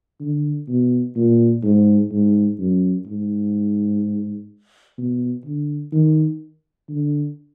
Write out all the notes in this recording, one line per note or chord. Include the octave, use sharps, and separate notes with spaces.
D3
B2
A#2
G#2
G#2
F#2
G#2
B2
D3
D#3
D3